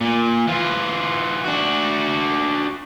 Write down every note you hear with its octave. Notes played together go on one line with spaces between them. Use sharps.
A#2
E3 F4
D4 F#4